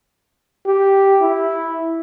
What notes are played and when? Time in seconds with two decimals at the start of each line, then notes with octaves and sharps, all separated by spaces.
0.67 G4
1.22 E4